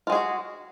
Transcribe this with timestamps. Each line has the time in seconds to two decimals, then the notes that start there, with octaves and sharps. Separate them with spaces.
0.07 F4
0.10 G#3
0.12 G#4
0.15 F#4